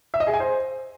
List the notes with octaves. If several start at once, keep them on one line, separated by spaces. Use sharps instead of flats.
E5
D#5
G#4
G#5
C5